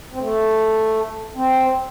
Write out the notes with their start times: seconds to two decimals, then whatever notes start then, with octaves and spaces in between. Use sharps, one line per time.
0.13 C4
0.20 A3
1.35 C4